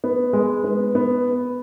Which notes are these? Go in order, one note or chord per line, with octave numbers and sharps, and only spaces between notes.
B3
G#3
B3
B3